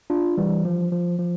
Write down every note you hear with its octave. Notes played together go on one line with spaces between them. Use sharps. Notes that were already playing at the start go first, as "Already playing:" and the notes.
D4 F4
E3 G3
F3
F3
F3